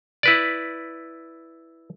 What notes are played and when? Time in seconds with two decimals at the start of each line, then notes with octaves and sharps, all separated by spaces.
0.23 E4 B4 D5